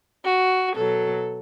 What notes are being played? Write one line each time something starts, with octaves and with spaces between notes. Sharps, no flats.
F#4
B2 F#3 A4